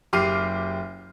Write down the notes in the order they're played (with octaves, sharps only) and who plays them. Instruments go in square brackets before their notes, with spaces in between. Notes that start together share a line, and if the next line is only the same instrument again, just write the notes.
[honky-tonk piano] F#1 G4 D6 F6 C7 D#7